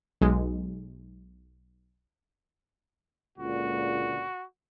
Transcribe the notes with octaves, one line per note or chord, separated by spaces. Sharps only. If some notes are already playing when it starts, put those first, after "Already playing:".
B1 G#3
C#2 A#2 D3 F#4